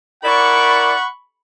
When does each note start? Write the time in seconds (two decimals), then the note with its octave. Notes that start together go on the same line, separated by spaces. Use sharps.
0.24 E4 A#4 D5 F#5 B5 C#6